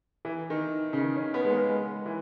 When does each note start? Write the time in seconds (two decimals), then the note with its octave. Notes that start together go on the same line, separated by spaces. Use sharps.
0.25 E3
0.50 D#3
0.93 C#3
0.97 D#3
1.16 C#4
1.34 B3
1.45 G#3
1.52 A#3
1.69 G#3
2.06 E3